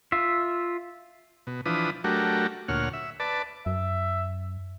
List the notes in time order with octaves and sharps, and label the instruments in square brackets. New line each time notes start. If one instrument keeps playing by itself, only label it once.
[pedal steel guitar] F4 E5
[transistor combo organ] B2
E3 F3 D4 B4 D#6
F#3 A3 D4 F#4 G4 A#4
D2 A#2 C#5 F#5 F6
E5
B4 D5 A5
[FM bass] F#2 [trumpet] E5